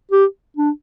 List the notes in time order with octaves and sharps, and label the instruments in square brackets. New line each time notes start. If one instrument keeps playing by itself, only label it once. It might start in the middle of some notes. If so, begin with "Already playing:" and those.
[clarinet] G4
D4